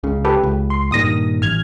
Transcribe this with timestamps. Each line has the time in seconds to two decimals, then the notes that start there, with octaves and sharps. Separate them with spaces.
0.04 C#2 C#3
0.25 G4 A4 B4
0.43 C#2
0.70 C6
0.92 G2 A#2 D#3 D#6 A#6
1.42 A1 F6 G#6